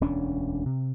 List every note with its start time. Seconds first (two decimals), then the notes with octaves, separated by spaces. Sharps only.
0.01 E1 D2 C#4 D4
0.66 C3